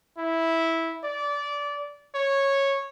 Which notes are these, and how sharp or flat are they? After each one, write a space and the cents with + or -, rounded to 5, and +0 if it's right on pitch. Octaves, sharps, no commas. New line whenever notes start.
E4 -10
D5 -20
C#5 -10